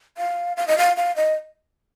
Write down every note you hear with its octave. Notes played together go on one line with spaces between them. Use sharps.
F5
F5
D#5
F5
F5
D#5